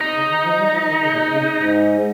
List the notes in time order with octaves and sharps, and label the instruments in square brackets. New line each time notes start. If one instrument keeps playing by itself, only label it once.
[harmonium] C3 [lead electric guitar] D#4
[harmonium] C#3
D#3
F3
G3
F3
D#3
C#3
A#2
C3
C#3
C3
G#2